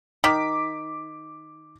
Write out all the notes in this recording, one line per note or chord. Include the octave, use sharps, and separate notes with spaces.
D#3 D6 B6